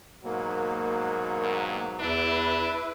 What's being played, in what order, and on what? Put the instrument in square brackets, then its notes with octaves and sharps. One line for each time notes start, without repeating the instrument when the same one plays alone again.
[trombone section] G#2 B2 F#3 [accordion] A#3
[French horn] G2
[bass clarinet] E2 [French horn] D4 [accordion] E4 B4